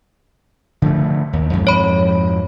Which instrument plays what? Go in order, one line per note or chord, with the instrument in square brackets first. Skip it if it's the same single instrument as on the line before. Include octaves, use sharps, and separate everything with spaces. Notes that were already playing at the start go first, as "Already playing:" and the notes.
[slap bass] D3 F3 A3
D#2
F2 G#2
[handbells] C#5 B5